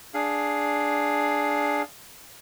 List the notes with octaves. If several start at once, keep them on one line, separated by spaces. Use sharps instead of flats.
D4 G#4 F5